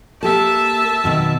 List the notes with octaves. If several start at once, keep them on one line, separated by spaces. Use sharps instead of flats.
A#3 G4 A4 E5 A5
B2 D#3 F#3